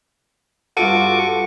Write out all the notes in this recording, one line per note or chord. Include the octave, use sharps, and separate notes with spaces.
G2 F4 F#4 A4 C#6 D6 D#7